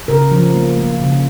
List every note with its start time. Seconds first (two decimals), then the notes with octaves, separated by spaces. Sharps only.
0.08 C#3 A#4
0.31 F3
0.54 A#3
0.77 A#3
1.00 C#3